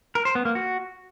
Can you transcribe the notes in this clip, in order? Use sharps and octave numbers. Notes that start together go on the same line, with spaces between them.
A#4
C5
B3
A#3
F#4